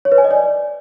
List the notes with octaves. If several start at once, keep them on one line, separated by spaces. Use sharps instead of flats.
C#5
B4
G#5
D#5
D5